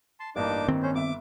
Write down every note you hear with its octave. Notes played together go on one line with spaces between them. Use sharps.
A5 C6
A1 G2 A#3 D4 D#4 D6
D#3 C4
C#4 C5
G1 E5 D6